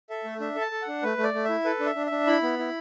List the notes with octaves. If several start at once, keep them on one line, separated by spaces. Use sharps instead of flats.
A4 E5
A3
D4 E5
A4
A5
A4
F#5
D4
A3 B4
A3
D5
A3
E4 E5
A4 B4
D4
E5
D4
E5
D4
E4 B5
B3
E4